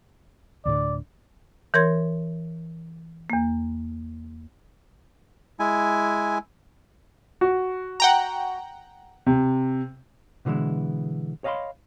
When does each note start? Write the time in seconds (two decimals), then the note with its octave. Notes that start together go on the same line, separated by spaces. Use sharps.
0.65 D2 A2 D3 D5
1.74 E3 A#4 C#5 C6 G#6
3.30 E2 A#3
5.60 G#3 E4 G#5
7.41 F#4
8.00 F#5 G5 A#5
9.26 C3
10.45 B2 D3 E3 G#3 E4
11.44 C#5 D#5 F5 G5 B5 C6